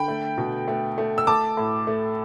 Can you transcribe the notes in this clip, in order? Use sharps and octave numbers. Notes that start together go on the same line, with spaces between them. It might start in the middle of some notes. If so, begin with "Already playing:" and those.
Already playing: D3 G5 B5
A3
B2
A3
A3
E6
A3 A5 D6
A2
A3